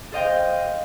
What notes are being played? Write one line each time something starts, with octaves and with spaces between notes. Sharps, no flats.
A4 C5 D#5 F5 G5